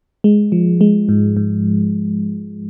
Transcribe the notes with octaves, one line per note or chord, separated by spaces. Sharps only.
G#3
F3
G#3
G#2
G#2